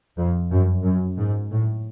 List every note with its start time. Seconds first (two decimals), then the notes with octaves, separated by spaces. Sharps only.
0.17 F2
0.50 F#2
0.83 F#2
1.18 G#2
1.51 A2